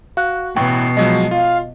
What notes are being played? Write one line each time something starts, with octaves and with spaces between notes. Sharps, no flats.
F#4 F5 F#6
A1 B2 E3 G5 C#6
F3 F#3 G#3 D#5
F4 F5